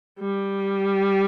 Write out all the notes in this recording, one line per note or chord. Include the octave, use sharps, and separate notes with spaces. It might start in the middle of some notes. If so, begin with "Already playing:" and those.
G3